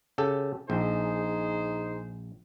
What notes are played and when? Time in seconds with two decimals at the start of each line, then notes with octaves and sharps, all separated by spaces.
0.18 C#3 G4 A4
0.70 A#1 D#4 G#4 C5